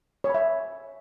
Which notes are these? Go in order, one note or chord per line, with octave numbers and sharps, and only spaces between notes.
C#5
B5
E5